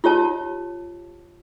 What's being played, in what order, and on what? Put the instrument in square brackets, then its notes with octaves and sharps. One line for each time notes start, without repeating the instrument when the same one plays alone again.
[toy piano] F4 G4 C#5 A5